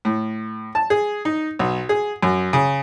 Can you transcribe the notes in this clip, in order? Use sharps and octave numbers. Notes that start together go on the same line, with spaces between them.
A2
A5
G#4
D#4
B1
G#4
F#2
C#3